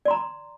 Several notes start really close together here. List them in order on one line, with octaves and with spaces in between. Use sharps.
D5 C6 A#5